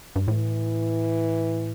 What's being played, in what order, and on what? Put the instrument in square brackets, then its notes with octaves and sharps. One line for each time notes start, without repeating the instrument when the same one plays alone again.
[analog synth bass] G2
[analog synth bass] A2 [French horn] E3